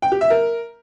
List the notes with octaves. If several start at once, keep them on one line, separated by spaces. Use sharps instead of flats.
G5
G4
E5
A#4